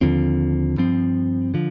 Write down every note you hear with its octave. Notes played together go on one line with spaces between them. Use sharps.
D#2 D3 F3 C4
G2 F3 C4
D3 F3